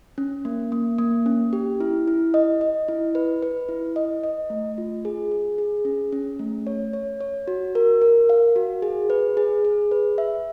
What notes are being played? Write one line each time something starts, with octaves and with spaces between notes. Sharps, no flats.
C#4
A#3
A#3
A#3
C#4
G4
E4
E4
D#5
D#5
E4
B4
B4
E4
D#5
D#5
A3
F4
G#4
G#4
G#4
C#4
C#4
A3
C#5
C#5
C#5
F#4
A#4
A#4
F5
F#4
G#4
B4
G#4
G#4
B4
E5